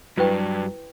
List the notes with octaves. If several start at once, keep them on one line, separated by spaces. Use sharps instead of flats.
G2 F#3 E4 B4 G5